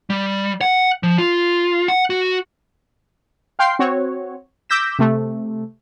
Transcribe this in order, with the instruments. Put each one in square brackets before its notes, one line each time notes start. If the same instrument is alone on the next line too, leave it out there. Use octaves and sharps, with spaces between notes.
[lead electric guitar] G3
F#5
F3
F4
F#5
F#4
[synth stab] F5 G5 C6 C7
C4 F#4 C#5
D6 E6 G6 A#6 B6 E7
C3 A3